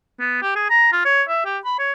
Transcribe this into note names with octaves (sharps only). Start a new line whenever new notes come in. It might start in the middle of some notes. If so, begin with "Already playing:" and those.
B3
G4
G#4
A#5
F4
C#5
E5
G4
B5
C#5